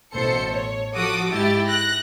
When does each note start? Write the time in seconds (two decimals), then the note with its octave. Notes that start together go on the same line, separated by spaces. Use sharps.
0.14 A1 B2 A4 C5 C#7
0.52 C#5
0.95 F3 F#4 A4 D6 D#6
1.31 G#2 E4 G4 A6
1.66 F#6 A#6